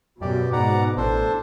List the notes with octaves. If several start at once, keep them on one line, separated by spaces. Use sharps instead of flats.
F#2 B2 G4 D5
G#2 D5 F#5 A#5
A1 D4 A4 C5